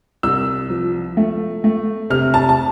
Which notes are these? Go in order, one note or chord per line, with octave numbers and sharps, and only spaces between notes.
C2 E6
F3
A3
A3
C3 F6
A5
A5